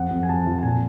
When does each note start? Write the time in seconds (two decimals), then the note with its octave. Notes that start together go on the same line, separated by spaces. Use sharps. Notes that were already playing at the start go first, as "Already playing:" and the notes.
Already playing: F2 F#5
0.11 F2
0.23 G#5
0.29 F2 A5
0.46 F3
0.58 A5
0.63 A#2 G#5